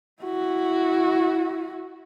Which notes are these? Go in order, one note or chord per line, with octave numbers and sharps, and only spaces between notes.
E4 F#4